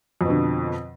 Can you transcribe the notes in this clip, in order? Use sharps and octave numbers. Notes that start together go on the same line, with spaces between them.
F2 B2 D3